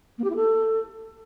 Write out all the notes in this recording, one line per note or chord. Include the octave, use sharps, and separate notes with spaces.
A#3
G4
E4
A4